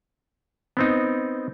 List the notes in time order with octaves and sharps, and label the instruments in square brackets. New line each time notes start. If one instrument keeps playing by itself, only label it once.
[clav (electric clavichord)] B3 C4 D#4